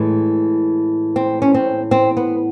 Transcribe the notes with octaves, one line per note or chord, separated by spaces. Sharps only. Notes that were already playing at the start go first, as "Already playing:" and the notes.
Already playing: A2 E3 G#3
C4
C#4
C4
C4
B3